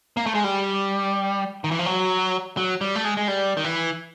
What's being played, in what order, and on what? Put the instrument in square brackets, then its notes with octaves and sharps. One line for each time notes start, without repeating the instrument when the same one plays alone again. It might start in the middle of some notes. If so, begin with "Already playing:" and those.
[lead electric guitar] A#3
A3
G#3
G3
D#3
E3
F3
F#3
F#3
G3
A3
G#3
G#3
G3
D#3
E3